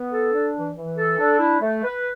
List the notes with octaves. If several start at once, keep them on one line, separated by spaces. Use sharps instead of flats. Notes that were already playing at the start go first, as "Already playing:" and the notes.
Already playing: B3
A4
D4
E3
E3
A4
D4
E4
A3
B4